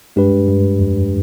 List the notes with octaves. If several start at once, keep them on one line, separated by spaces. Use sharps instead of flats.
G2 G#3 D4 G4 B4
G2
F2